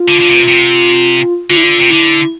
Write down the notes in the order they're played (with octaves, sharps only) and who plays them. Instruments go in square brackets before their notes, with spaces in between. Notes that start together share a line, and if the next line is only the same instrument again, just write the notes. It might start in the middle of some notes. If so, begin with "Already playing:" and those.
Already playing: [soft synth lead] F4
[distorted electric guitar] D3
D3
C3
C3
[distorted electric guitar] D3 [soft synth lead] F4
[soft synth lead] E4
F4
[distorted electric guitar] C3
[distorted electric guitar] D3 [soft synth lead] E4